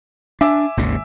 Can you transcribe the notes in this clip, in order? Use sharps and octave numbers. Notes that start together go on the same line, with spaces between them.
D4 E5 G#5 D6
G#1 D#2 C#3